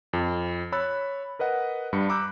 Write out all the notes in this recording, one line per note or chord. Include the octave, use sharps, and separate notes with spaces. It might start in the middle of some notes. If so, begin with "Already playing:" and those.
F2
C#5 B5 E6 F#6 A6
A#4 B4 D#5 F#5
G2 G3 B5 C#7
A#5 B5 D6 E6 F#6 G6